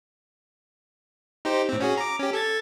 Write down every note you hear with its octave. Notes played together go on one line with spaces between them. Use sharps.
D#4 G4 C5
A2 C4
C#4 F#4 G#4
A#5 D6
C#4 G4
A4 G#6 A6